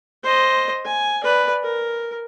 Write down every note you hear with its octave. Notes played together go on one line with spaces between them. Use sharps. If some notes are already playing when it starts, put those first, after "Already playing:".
C5 D#5
G#5
B4 D5
A#4